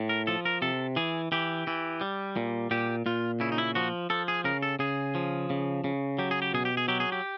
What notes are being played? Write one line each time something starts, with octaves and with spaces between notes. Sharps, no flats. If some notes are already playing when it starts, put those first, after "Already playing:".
Already playing: A2
A#4
F3 A4
A#4
C3 A4
E3 G#4
E3 G4
E3
G3
A#2
A#2 G4
A#2 F4
C#3 E4
D#4
E4
F3 F#4
F3 A4
G#4
C#3 A#4
A4
C#3 G#4
F3
C#3
C#3
F#3 G4
G#4
G4
B2 G#4
G4
G#4
F#3 G4
G#4
G4